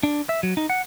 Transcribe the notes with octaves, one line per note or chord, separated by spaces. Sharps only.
D4
E5
F#3
D#4
F#5